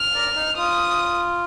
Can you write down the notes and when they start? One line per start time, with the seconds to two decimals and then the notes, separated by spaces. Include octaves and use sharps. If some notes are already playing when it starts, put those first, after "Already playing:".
Already playing: F6
0.14 A#4 D5
0.35 D#4
0.57 F4 D#6